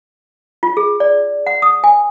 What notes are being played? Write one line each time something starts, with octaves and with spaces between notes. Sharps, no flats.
F4
G#4
D5
F#5
D#6
G#5